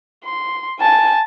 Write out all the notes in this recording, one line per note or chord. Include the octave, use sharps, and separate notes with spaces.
C6
G#5 A5